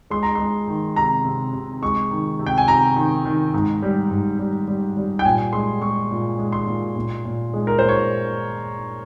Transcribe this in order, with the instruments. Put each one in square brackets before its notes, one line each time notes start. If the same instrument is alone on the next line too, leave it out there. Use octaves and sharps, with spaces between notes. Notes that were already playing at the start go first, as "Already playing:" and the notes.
[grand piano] G#3 C6
A#5
G#3 C6
D#3
C3 A#5
C3
C3
G#3 C#6
D#3
C3
G5
G#5
C3 A#5
D#3
D#3
G#2
G3
G#2
G3
G3
G3
G5
A#2 G#5
G#3 C6
G#3 C#6
A#2
G#3
C6
A#2
A#2
A#2
G#3
A#4
A#2 C5
C#5